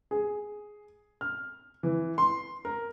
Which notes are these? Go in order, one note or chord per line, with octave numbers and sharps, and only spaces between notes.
G#4
F6
E3
C6
A#4